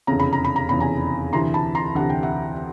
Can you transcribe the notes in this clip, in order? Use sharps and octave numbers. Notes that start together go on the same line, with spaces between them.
F1 E2 C#3 A#5
B5
A#5
B5
A#5
F1 E2 C#3 B5
G#5 A#5
D2 C3 E3 A#5 C6
A5 B5
A#5 C6
D2 C3 E3 F#5
G5
E5 F#5